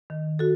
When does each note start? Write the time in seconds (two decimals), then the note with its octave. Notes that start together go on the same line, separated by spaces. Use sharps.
0.10 D#3
0.39 F#4 A4